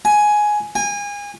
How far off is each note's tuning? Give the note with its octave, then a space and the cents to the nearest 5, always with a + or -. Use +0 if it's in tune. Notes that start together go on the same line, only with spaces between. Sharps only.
G#5 +10
G#5 -30